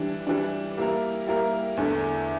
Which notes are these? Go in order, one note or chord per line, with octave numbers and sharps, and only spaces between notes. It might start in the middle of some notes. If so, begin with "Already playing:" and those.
Already playing: E3 G3 D4
E3 G3 D4
G3 A#3 E4 A#4
G3 A#3 E4 A#4
E2 D3 A3 E4